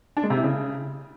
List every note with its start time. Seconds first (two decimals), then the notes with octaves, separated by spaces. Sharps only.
0.17 D4
0.23 G#3
0.30 C3
0.37 E4
0.44 C#3